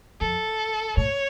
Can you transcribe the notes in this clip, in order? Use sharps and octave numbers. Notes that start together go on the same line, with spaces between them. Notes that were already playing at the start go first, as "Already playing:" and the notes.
F2 A4
A2 C#5